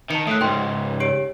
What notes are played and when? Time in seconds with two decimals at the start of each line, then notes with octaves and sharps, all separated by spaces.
0.11 D#3 A5 C#7
0.27 A2 D#6 F#6
0.41 C#2 G#2 G5 C6
1.00 G4 C#5 D7